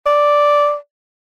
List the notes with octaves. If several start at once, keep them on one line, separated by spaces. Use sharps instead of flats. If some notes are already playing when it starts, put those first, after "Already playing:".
D5